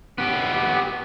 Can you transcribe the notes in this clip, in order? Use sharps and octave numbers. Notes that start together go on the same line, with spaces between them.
B3 G4